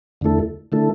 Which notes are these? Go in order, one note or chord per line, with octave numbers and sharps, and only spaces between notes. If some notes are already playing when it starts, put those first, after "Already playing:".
E2 D3 A3 E4 A4
D3 A3 E4 A4